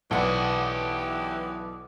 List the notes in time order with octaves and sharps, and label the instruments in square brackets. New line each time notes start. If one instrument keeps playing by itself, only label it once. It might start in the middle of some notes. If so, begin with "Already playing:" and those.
[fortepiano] B1 D5 [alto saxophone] E3 [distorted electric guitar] G4 F#5 [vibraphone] B4 D6 D#6